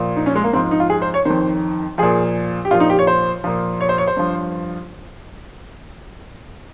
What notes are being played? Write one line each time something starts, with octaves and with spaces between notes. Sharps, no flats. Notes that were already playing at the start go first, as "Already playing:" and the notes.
Already playing: A#2 F3
D#4
C#4
G#3
A#3
G#2 F3 C4
D#4
F4
G#4
C5
C#5
F2 D#3 C5
A#2 F3 G#4
G4
A#2 F3 F4
D#4
G4
C#5
C5
A#2 F3
C#5
C5
C#5
C5
G2 F3